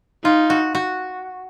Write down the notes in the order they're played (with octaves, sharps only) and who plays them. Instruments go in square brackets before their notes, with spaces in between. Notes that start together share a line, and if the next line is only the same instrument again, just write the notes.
[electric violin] D#4 [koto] F4
[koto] F#4
F#4